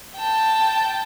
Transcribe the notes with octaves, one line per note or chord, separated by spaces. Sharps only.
G5 A5